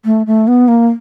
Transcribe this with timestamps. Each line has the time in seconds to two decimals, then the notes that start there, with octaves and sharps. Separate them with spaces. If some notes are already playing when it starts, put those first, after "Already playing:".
0.05 A3
0.27 A3
0.47 B3
0.68 A#3